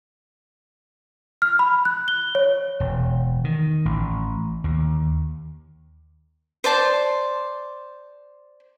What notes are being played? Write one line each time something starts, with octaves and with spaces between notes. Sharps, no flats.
F6
B5
F#6
G7
C#5
E1
D#3
A1
D#2
C5 D5 A5 C6